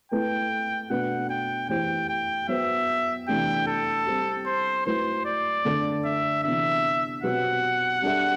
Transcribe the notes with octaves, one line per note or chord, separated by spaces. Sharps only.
A3 E4 B4 G5
B2 A3 D4 F#4 B4 F#5
G5
E3 A3 E4 G4 C5 G5
G5
F#3 B3 F#4 C5 E5
C3 E3 A3 D4 G4 G5
A4
G3 C4 G4
C5
F#3 A3 E4 B4 C5
D5
D3 A3 D4 A4
E5
C3 E3 B3 D4 E5
B2 F#3 C4 G4 B4 F#5
G3 D4 A4 E5